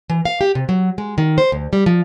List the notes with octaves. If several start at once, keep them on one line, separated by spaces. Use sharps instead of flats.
E3
F5
G4
C3
F#3
G#3
D#3
C5
D2
G3
F3